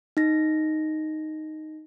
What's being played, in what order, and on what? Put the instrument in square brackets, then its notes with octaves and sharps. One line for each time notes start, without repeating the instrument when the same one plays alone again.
[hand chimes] D#4 A#6